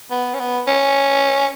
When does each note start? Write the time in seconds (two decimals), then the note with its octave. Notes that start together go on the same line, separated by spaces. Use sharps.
0.11 B3
0.34 C#4
0.40 B3
0.67 C#4